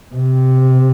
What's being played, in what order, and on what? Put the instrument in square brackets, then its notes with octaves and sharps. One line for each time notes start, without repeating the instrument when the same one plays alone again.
[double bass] C3